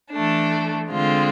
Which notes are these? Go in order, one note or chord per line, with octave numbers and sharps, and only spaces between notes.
E3 A3 D4
D3 G#3 C4 F4